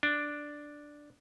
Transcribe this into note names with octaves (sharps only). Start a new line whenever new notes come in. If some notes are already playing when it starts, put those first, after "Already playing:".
D4